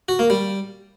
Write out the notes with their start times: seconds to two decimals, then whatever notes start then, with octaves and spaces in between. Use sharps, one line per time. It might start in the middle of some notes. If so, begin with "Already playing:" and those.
0.09 F#4
0.19 A#3
0.30 G3